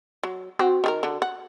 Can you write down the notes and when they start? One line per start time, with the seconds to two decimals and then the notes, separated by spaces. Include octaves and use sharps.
0.23 F#3
0.59 C4 F#4
0.84 D#3 G#4 A#4
1.03 D3
1.22 F#5